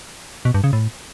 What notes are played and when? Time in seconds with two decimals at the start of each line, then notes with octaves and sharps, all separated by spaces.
0.45 B2
0.54 G2
0.64 C#3
0.73 A2